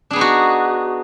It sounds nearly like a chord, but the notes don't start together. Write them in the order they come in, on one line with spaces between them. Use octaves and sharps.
D4 G#4 B3 D#4 F#4